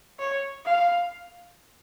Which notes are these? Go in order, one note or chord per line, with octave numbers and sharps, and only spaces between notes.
C#5
F5